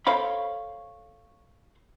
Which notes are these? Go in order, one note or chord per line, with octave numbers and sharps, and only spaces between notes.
A4 C5 C#5 F5 B5